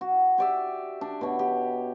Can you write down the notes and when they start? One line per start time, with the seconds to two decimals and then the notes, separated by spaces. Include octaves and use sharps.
0.01 F#4
0.38 G4 D5 E5
1.01 D4
1.21 B2 C#5
1.39 G4